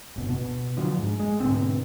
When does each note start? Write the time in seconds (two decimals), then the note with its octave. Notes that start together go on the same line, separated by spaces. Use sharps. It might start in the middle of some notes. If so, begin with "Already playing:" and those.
0.16 D1 G1 B2
0.30 B2
0.77 D3 F3 F#3
0.98 G#2
1.20 G#3
1.40 G#2 B2 D3 C4